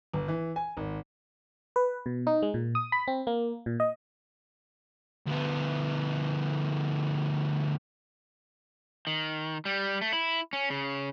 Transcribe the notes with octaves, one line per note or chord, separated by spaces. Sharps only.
G1
E3
G#5
G#1
B4
B2
D#4
G#3
A#2
D#6
B5
C4
A#3
A#2
D#5
D2 B3
D#3
G3
A3
E4
C#4
C#3